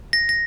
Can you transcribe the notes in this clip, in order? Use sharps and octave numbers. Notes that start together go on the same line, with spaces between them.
A#6
A#6